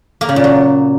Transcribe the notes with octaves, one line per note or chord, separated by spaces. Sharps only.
A#3
C#3
A#2
F#3